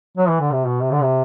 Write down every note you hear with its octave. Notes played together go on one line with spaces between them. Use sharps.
F#3
E3
D3
C3
B2
C3
D3
C3